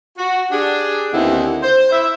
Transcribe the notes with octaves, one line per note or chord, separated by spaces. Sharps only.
F#4
D4 G4 G#4
D#2 D3 B3 C4 D#4 E4
C5
E4 E5